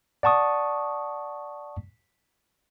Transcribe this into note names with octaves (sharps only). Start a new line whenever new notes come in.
D5 F#5 A5 C#6 D#6